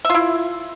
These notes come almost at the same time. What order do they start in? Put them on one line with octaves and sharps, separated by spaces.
E5 F4 E4